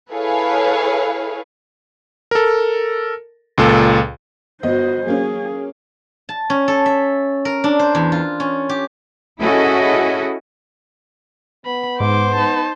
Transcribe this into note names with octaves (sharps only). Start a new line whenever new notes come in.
E4 G#4 A4 B4 C#5 F5
A4 A#4
C#2 A#2 A4
G1 B3 F#4 C5 D#5
F#3 A#3 C#4 G#4
A5
C#4
A4
E5
A#4
D4
C5
E2
F4
C#4
G4
C#4 E4 F#4 G#4 A4 D#5
B3 B5
G#2 C5 D6
D#4 A5